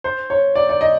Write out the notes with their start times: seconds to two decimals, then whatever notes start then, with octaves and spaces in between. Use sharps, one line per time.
0.04 C5
0.30 C#5
0.55 D5
0.69 D5
0.81 D#5